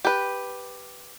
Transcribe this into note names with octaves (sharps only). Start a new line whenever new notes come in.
G4 B4